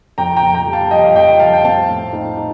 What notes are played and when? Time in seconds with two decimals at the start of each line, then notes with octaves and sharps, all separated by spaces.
0.18 F2 G5 A#5
0.37 G5 A#5
0.42 F2
0.54 G5 A#5
0.67 G3
0.73 F5 A5
0.91 F2 D#5 G5
1.04 F5
1.15 F2 D#5 G5
1.39 F2 F5 A5
1.53 G5
1.65 C4 F5 A5
1.88 A2
2.13 D#4
2.37 D#4